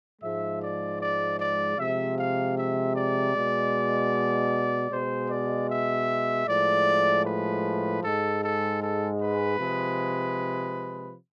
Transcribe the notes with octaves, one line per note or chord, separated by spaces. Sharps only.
G#2 F3 G#3 E5
D5
D5
D5
C3 F3 G#3 E5
F5
E5
D5
B2 G#3
B2 G#3 C5
D5
E5
A2 F3 G#3 D5
B4
G#2 G#3 A4
A4
A4
B4
C3 F3 G#3